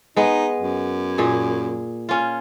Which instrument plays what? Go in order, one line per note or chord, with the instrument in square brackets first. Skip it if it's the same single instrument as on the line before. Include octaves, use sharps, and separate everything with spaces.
[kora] G#3 B3 [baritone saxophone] D#4
[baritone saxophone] F#2
[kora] A#2 G#4
C#4 F4